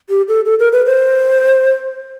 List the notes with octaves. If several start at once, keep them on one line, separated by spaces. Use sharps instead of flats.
G4
A4
A4
A#4
B4
C5